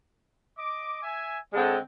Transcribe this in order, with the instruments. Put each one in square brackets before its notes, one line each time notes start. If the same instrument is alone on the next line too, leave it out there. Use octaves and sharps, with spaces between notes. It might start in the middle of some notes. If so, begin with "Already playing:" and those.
[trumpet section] D#5 D6
E5 G#5
[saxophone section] D3 G#3 C4 [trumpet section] E4 C#5 A5